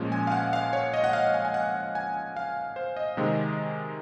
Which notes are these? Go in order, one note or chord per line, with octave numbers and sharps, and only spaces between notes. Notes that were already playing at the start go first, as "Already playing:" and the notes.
Already playing: A#2 F3 G#3 C#4
G#5
F5
F#5
F5
C#5
D#5
F#5
F5
G#5
G#5
F#5
G#5
F5
C5
D#5
C3 D#3 G#3 C4